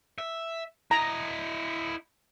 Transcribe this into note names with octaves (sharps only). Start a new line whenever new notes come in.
E5
E4 D#5 A#5